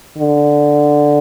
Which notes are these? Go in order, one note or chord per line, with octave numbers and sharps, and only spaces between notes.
D3